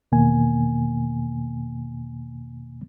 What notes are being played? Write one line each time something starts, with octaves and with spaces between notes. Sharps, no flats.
E2 B2 D#3 A#3 G#5